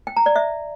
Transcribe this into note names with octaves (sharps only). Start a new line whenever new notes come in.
G5
A#5
D5
E5